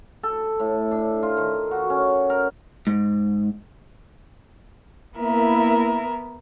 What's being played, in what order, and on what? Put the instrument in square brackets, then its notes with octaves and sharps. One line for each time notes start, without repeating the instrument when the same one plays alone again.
[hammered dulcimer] A4
A2
D4
F4
D#3
F#4
C#4
A#4
[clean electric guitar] G#2
[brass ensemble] A#3 E4 [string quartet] B3 A#4 E5